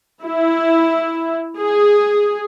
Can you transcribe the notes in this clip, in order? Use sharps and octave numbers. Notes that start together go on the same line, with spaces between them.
E4
G#4